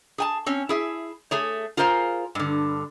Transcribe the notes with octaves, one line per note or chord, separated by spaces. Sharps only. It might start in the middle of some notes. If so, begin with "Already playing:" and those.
G#4 G#5 A5
C4 C#4
E4 G#4 E5
A3 G#4 C#5
F4 G#4 A#4 C5 F5
G2 D3